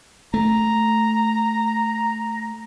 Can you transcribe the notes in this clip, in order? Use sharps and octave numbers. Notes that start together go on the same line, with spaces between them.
A3 A#5